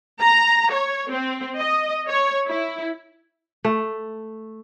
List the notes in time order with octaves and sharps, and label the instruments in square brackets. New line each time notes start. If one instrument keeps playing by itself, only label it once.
[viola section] A#5
C#5
C4
D#5
C#5
E4
[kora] A3